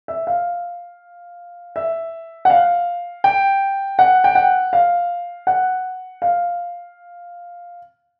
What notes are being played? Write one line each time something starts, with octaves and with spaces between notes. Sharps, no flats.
E5
F5
E5
F#5
F5
G5
F#5
G5
F#5
F5
F#5
F5